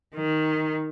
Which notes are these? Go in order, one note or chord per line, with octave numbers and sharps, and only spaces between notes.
D#3